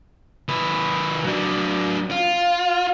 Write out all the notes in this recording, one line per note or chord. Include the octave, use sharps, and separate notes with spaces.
D#3 B4
F#3 D4
F4